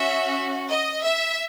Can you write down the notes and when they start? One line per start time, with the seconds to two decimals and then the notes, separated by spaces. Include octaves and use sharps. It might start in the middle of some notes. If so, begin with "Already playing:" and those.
Already playing: C#4 F#4 E5
0.69 D#5
1.03 E5